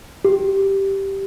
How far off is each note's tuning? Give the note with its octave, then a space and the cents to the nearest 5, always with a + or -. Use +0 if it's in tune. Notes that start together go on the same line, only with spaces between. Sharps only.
G4 -5